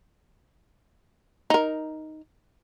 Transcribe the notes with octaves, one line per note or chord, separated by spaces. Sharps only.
D#4 A#4